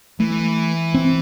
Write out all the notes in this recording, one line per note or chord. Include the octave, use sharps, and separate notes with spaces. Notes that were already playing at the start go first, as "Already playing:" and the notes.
E3 A3
C4